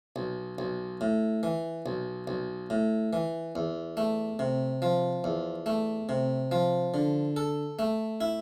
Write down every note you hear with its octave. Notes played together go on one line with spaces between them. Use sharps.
B1
B1
A2
E3
B1
B1
A2
E3
E2
A3
C3
F3
E2
A3
C3
F3
D3
A4
A3
E4